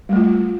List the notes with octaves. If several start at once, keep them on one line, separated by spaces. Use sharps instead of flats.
G3 A3 F4